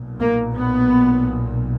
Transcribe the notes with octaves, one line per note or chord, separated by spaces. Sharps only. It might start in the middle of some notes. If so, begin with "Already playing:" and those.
Already playing: B1 A#2
A#3
B3